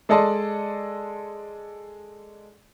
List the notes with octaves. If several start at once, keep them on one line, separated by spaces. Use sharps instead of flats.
G#3 A4 D5 D#5 A5 C6